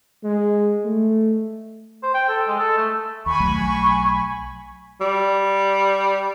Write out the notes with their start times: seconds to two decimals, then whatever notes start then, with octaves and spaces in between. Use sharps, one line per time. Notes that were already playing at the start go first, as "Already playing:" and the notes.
0.24 G#3
0.85 A3
2.03 C5
2.14 G5
2.29 A4
2.48 G#3
2.59 A4
2.77 A3
3.26 D#2 G#5 B5 C#6
3.40 B1 F#3 A3
5.00 G3